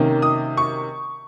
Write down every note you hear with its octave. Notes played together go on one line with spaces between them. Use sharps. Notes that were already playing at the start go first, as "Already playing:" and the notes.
Already playing: C3 D#3 A#3 C#4
D#6
C#6